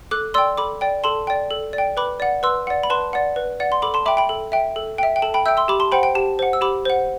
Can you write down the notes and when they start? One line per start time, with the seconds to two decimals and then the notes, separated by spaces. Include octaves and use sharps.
0.11 A4 D6 F#6
0.34 D5 G5 C6 E6
0.57 A4 B5 D6
0.81 D5 G5
1.04 A4 A5 C6
1.27 D5 G5
1.50 A4
1.73 D5
1.78 G5
1.97 B4 B5 D6
2.20 D5 F#5
2.43 B4 C6 E6
2.67 D5 F#5
2.83 B5
2.90 B4 A5 C6
3.13 D5 F#5
3.36 B4
3.60 D5 F#5
3.72 C6
3.82 A4 B5 D6
3.94 A5 C6
4.06 E5 G5 B5 D6
4.17 G5 B5
4.29 A4
4.52 E5 G5
4.76 A4
4.98 E5 G5
5.16 G5
5.22 A4 A5
5.34 G5 B5
5.46 E5 G5 E6 G6
5.57 C6 E6
5.68 G4 B5 D6
5.80 A5 C6
5.92 C5 F#5 G5 B5
6.03 G5
6.15 G4 A5
6.39 C5 F#5
6.53 E6
6.61 G4 B5 D6
6.85 C5 F#5